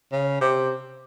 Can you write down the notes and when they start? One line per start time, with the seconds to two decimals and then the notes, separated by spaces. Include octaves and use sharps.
0.12 C#3
0.41 C3